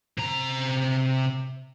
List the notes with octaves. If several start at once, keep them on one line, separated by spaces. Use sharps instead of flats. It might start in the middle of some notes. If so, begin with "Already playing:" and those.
C3 A#5